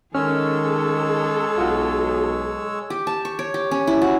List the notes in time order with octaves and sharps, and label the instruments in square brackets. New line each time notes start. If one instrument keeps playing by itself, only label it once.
[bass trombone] D#3 [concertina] G#3 C#5 E6 [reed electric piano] C#4 F6 [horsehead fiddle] G#4 A4
[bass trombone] B1 [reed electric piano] F4 F#4
[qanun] G4
A5
C#6
C#5
G4
C#4
E4
F#4